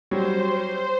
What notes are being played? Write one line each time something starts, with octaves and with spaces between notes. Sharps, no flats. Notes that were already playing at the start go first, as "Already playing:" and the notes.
F#3 G3 C5 C#5